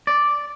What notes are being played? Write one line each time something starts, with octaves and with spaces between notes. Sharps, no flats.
D5